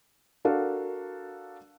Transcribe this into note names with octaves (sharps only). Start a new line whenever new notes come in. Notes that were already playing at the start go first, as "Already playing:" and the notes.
D4 F#4 A4 A#4 F5